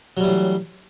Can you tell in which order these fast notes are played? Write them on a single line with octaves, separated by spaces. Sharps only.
F#3 G3 E3 A2